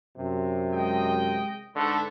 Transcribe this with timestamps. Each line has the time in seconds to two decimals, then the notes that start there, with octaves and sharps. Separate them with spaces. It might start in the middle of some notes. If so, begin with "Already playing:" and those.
0.17 F#2 C3
0.73 G#3 D#5 G5
1.75 G#2 D3 A3 B4